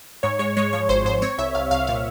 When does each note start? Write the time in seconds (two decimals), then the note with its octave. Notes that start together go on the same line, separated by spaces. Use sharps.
0.23 G#2 C#5
0.39 G#3 C#5
0.57 G#3 C#5
0.73 F3 C#5
0.89 G#1 C5
1.05 G#2 C5
1.22 C4 C#5
1.38 C2 E5
1.55 C2 F5
1.71 C2 F5
1.87 A#2 F5